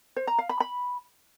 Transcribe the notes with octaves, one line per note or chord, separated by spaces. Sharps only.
C5
A#5
F5
B5
B5